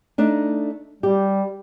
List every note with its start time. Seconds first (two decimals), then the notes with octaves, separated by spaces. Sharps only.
0.18 A3 D4 D#4
1.03 G3 G4